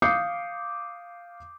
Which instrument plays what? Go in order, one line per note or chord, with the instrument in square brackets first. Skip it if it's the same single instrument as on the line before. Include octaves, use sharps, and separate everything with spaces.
[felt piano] F5 D6 D#6 G6 C7 C#7